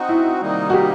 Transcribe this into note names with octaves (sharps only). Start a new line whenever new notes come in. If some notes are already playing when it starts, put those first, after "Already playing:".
Already playing: C4 D#4 F#4
E4
C3 D#3 G3 A#3 D#4
F#4
G4